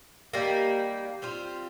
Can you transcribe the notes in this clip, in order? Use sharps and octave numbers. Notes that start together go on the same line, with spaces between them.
D#3 G3 A#3
G3 C4 F4